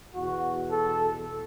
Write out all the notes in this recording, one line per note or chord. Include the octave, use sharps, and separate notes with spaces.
E2 B2 F#4
A4